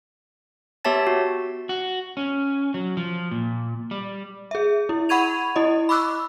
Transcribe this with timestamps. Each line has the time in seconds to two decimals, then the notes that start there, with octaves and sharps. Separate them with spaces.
0.85 B3 G4 C#5 E5 A5 A6
1.07 F#4
1.69 F#4
2.17 C#4
2.74 F#3
2.97 F3
3.31 A#2
3.91 G3
4.51 G#4 E5
4.89 E4
5.09 F#5 B5 C#6 G#6 D#7 F7
5.56 E4 D#5
5.89 B5 C#6 D6 E6 F#6